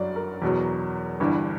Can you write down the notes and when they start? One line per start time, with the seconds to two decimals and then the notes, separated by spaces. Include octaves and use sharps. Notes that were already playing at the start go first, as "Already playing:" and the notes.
Already playing: G1 F#2 D3 F#3 D5
0.16 A#4
0.42 E2 B2 F#3
1.20 G1 G2 E3